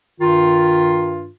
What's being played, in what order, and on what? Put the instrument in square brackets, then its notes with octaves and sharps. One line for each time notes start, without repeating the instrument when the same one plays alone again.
[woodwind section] G2 D#3 F4